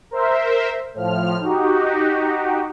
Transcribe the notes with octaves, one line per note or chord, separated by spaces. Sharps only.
A#4 C5 E5
A2 F3 F6
D#4 F#4 G4